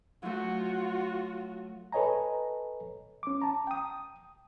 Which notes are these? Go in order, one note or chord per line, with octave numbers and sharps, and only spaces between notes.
F#3 A3 F4 F#4
A4 B4 C#5 D#5 G#5 A#5
C#4 D6
A5 A#5
G5 D#6